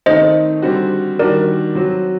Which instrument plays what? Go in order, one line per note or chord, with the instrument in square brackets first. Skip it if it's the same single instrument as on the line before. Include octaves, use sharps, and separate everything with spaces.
[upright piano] D#3 A3 C4 D#4 [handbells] C5 D#5
[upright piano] D3 G3 C4 F#4
[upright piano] D#3 G3 D4 F#4 [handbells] A#4 D5
[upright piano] F#3 C4 F#4